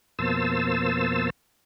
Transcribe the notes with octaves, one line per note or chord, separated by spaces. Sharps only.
F2 B2 A#3 C5 A5 E6